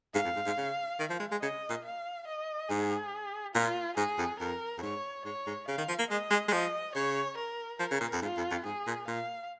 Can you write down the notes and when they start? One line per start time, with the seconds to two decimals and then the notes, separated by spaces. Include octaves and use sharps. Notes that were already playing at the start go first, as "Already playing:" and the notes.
0.14 G#2 F5
0.24 F2
0.36 G#2
0.46 G#2
0.57 C#3
1.00 D#3
1.10 F3
1.20 G#3
1.32 G#3
1.42 C#3 D#5
1.70 A#2
1.84 F5
2.27 D#5
2.69 G#2 G#4
3.54 A#2 F4
3.97 G#2 G#4
4.18 F2
4.40 F2 A#4
4.78 F2
4.82 G#2 C#5
5.25 G#2 C#5
5.47 G#2
5.68 C#3 F5
5.78 D#3
5.89 F3
5.99 A#3
6.10 G#3 D#5
6.31 G#3
6.48 G#3
6.52 F3 D#5
6.95 C#3 C#5
7.37 A#4
7.80 F3 A#4
7.91 C#3
8.01 A#2
8.12 F2
8.22 G#2 F4
8.37 F2
8.51 F2
8.65 G#2 G#4
8.87 A#2
9.07 A#2 F5